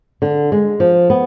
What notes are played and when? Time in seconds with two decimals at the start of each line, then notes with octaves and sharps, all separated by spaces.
0.22 D3
0.52 G#3
0.80 F3
1.10 B3